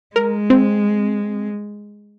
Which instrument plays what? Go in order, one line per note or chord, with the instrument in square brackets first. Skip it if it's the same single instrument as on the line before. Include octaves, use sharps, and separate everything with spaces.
[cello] G#3 [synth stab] A#4
[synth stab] C4